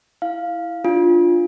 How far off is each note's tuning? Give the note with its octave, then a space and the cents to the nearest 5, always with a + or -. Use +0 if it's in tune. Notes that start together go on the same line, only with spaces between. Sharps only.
E4 +0 F5 +0
D4 +0 F4 +0